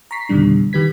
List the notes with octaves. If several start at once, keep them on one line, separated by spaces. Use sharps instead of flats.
A#5 C#6 B6 C7
F2 B2 D3 D#3 G3 D4
D#3 G4 B4 G#6 B6